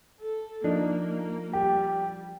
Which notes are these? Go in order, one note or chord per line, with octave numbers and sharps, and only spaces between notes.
A4
F3 A#3 D4 D#4
G3 G4